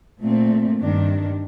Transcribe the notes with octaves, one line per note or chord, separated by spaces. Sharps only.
A#2 A3 C4
G2 D#3 G3 D4